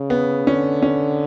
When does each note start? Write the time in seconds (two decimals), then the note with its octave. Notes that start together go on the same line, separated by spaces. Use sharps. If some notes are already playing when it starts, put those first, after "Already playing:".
Already playing: C#3
0.10 B3
0.46 D3 C#4
0.82 C#4